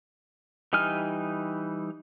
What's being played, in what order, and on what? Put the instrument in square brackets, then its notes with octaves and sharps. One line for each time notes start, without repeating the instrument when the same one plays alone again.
[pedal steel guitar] E3 G3 D#4 G#5 F6